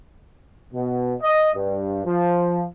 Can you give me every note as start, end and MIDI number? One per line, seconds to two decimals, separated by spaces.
0.72 1.13 47
1.21 1.50 75
1.55 2.01 43
2.05 2.64 53